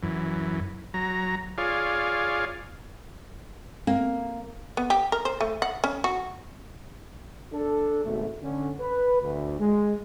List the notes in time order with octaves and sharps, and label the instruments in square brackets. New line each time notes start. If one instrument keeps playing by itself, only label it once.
[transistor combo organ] F#2 E3
F#3 A#5
F4 G#4 C#5 D5 F5
[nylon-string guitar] A#3 [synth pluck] C4
[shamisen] B3
G4
A#4
C5
A3
F#5
C#4
F#4
[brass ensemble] D4 A4
G#1 B2 A3
D3 C#4
B4
D2
G#3